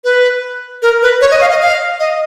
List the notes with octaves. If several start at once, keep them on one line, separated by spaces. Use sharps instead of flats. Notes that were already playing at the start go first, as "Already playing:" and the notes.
B4
A#4
B4
C#5
D#5
F5
D#5
F5
D#5